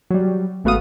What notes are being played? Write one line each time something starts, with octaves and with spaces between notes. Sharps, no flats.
F#3 G3
G#1 A3 B3 F#4 F5 D#6